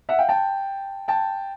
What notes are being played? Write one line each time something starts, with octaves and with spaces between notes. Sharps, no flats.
E5 F#5
F5 G5
G5 A5
G5 A5